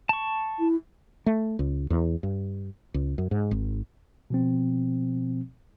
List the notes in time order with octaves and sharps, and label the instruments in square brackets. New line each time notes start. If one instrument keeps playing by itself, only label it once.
[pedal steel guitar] A5 C#6
[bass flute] E4
[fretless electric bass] A3
C#2
E2
G2
C#2
F#2
G#2
G#1
[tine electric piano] B2 F3 C4